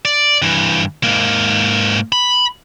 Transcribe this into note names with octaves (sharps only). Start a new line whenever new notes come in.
D5
G2 E3
G#2 A#3
B5